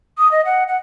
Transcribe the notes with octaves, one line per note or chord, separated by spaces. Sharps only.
D#6
D#5
F#5
F#5